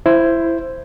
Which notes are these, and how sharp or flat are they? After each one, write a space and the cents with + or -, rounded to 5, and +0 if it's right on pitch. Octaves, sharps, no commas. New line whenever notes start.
E4 +15 C5 +0